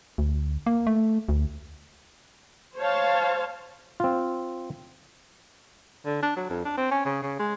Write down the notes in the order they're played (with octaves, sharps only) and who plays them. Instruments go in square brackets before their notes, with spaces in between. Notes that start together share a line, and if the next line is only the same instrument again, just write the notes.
[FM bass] D2
A#3
A3
D2
[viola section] C5 C#5 F5 A5
[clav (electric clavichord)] C4 F4
[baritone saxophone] D3
D4
F#3
F2
D4
C4
C#4
C#3
C#3
G#3